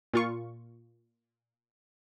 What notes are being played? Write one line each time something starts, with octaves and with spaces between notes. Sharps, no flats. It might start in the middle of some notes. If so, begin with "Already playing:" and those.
A#2 F4 C#6